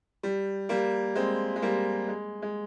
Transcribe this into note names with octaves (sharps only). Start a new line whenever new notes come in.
G3
G3 A#3
G#3 C4
G#3
G3 A#3
G#3
G#3